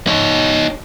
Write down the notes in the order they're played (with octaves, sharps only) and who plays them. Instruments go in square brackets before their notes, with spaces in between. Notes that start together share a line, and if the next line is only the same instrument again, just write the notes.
[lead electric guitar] D#4 C#5